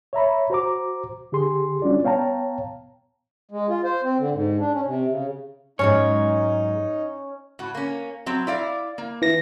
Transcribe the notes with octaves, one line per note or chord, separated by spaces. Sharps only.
C#5 E5 A#5 B5
F#4 C5 A#5 D6
D3 G4 G#4 C6
G3 C#4 D4 F4 F#4 D5
B3 C#5 F5 G5 A5 A#5
G#3
F4
C5
C4
D3
G#2
D4
C#4
C3
C#3
G#2 F#3 G#3 C#4 D#4 C#5
A2 F#4
A#3 C#4
F#3 C4
E4 D5 F5
A#3
E3 A#6